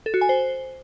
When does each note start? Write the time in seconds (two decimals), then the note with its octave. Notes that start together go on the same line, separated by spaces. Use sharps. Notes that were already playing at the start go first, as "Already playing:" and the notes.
0.06 A4
0.14 F#4
0.21 G#5
0.29 C5